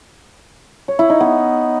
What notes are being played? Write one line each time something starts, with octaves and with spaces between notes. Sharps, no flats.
C#5
E4
D#4
B3